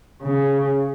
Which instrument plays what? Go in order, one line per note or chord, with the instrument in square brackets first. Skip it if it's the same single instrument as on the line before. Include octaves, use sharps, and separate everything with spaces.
[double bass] C#3